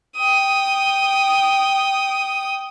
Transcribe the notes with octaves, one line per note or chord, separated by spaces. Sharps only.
G5 D#6